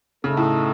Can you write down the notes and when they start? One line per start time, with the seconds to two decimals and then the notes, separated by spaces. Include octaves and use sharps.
0.24 C#3 A3 D#4 A4
0.37 A2